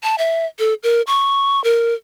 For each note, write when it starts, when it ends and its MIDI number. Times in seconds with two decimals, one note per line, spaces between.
0.03 0.16 81
0.18 0.46 76
0.59 0.74 69
0.83 1.02 70
1.07 1.62 85
1.64 1.94 70